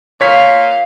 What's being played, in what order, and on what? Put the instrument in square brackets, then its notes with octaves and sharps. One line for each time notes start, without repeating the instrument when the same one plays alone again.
[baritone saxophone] A#2 [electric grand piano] C#5 B6 [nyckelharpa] F5